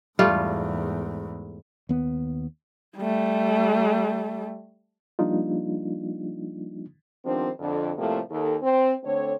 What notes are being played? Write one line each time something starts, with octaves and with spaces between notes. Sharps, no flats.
E2 G#2 G3 A3 F4
D#2 B3
G3 A3
F3 G3 A#3 D4 D#4 F4
D#3 F3 G3 B3 C4 D4
F2 D3 C4
A2 C3 F3 G3 A3 A#3
D#2 A4
C4 C5
D3 A3 C4 C#5